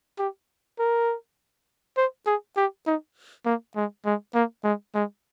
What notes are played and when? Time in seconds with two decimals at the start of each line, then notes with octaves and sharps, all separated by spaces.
0.19 G4
0.79 A#4
1.97 C5
2.26 G#4
2.57 G4
2.87 D#4
3.45 A#3
3.76 G#3
4.06 G#3
4.34 A#3
4.64 G#3
4.95 G#3